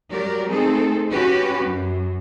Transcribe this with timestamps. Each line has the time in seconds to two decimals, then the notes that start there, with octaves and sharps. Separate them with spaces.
0.10 F#3 G3 G4 A#4 D5
0.50 A3 C4 D#4 G#4 A4
1.11 C#4 F#4 G4 B4
1.64 F#2